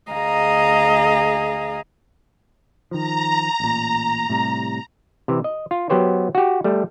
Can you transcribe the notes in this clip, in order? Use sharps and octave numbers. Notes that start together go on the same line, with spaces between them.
D2 G#4 D#5 F5 A#5
D#3 F3 A#5
A1 A#2
A2 C3 G3
C3 E3
D#5
F4
F#3 B3 G4 C5 C#5
F#4 G4
G3 A3